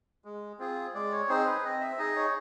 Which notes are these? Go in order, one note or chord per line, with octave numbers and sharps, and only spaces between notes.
G#3
C4 F4 G#4
G#3 D5
C#5
C4 D#4 G#4 C5
B4
C4 D#5
E5
D#4 G#4 D#5
C#5